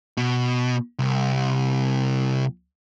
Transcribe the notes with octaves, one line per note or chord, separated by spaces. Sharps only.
B2
C2